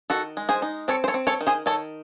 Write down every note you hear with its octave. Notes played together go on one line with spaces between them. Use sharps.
D#3 F#4 A4
G#3
G#4 C5
D#4
C4 A4 C#5
C5
A4 C#5
C4
A4 C#5
D#3
G#4 C5
D#3 A4 C#5